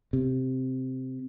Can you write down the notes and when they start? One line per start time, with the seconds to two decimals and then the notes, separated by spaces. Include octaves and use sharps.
0.13 C3